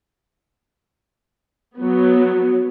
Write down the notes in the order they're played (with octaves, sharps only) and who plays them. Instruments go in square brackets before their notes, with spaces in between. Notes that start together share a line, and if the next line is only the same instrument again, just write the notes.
[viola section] F#3 B3